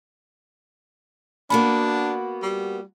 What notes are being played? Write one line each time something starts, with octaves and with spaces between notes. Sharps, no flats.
A#3 B3 D4 F#4 B5
G3